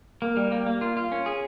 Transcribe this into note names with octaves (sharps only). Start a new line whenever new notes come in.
A#3
G3
A#3
A#3
F4
F4
C#4
G#4